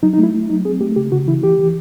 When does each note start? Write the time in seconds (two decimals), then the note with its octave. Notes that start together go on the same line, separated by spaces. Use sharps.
0.03 F#3 D#4
0.13 D#4
0.18 A3
0.23 E4
0.34 A3
0.49 F#3 D#4
0.65 C4 G#4
0.81 A3 G4
0.96 C#3 G4
1.12 C#3 F#4
1.27 E3 E4
1.43 E3 G4
1.59 E3